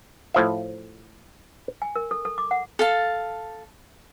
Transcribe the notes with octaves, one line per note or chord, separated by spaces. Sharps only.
A2 F3 E5
G#5
A#4
A4
A4
D6
F#5
A4 F5 A5